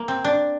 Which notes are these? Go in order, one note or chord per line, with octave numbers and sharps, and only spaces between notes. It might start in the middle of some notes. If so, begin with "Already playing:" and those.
Already playing: A#3
C4
D4